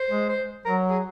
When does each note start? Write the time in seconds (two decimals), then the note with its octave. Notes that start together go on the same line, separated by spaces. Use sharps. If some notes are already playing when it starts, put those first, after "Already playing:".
Already playing: C5
0.10 G#3
0.29 C5
0.65 F#3 A#4
0.90 G#4